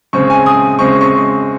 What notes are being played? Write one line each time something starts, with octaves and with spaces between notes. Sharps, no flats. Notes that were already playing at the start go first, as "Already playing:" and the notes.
C#3 G#3 C4 C#6
G#5
D#6
C#3 G#3 C4 C#6
C#6